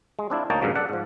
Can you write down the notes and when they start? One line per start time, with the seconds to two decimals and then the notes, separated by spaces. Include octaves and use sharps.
0.19 G#3
0.30 C4 D4 E4 F4
0.50 D2 A#3 D#4 C#5 G5 A5
0.61 G2 A#2 C#3 F3 F#3
0.76 A4 D5 F#5
0.89 G#2 F3